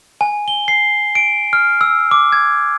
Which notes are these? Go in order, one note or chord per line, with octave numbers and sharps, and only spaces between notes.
G#5
G7
C7
D7
F6
E6
D6
G#6